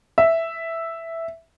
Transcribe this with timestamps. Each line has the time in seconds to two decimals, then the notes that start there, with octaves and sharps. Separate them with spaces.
0.18 E5